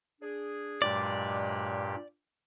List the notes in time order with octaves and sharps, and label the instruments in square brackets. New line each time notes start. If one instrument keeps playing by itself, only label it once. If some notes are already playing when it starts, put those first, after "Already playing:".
[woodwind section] D4 G#4
[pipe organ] G2 A#2 G4 [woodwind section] F#3 G#3 [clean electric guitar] D5